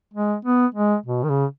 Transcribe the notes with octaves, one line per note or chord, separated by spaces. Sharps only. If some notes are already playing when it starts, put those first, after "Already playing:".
G#3
B3
G#3
B2
D#3
C#3